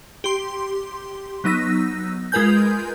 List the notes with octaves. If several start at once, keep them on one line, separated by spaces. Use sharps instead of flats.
G4 C6
F#3 B3 D#4 E6 A#6
G#3 F4 A#4 B4 G#5 G6